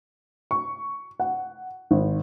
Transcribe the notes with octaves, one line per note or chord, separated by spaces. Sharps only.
C#6
F#5
G#1